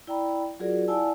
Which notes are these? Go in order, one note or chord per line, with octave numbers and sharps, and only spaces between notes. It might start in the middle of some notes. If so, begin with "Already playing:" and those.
E4 D5 G5 A#5 B5
F#3 F4 F#4 G#4 A#4 D5
E4 D5 F#5 G#5 A5 E6